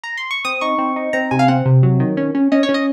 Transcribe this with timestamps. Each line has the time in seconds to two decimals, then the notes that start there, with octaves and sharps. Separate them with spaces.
0.04 A#5
0.17 C6
0.31 C#6
0.45 C4 D#6
0.61 D#4 C#6
0.79 C4
0.96 D#4
1.13 C4 A#5
1.31 C3 G#5
1.39 F5
1.48 C4 F#5
1.66 C3
1.83 F#3
2.00 D#3
2.17 C#4
2.35 C#4
2.52 C#4 D#5
2.63 C#5
2.69 C#4
2.74 D#5